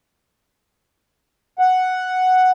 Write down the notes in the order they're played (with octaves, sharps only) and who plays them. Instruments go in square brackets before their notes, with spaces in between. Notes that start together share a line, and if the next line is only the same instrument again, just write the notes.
[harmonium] F#5